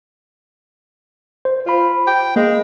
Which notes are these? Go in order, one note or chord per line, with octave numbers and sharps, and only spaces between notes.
C5
F4 C5 B5
G5
G#3 A#3